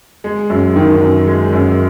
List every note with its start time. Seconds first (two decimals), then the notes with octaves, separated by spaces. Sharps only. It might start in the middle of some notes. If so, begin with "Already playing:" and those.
0.24 G#3
0.50 F#2
0.76 D#3
1.01 F#2
1.27 G#3
1.53 F#2